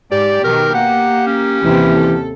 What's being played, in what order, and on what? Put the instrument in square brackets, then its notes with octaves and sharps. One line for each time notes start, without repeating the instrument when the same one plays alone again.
[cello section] G#2 [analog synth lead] G4 [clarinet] D5
[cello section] B2 D#3 [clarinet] A#4
[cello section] A#3 [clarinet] F#5
[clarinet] C#4
[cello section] D#2 C3 E4 [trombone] E3
[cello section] A4